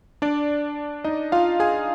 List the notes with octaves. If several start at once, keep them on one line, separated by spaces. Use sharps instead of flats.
D4 D5
D#4 D#5
F4 F5
G#4 G#5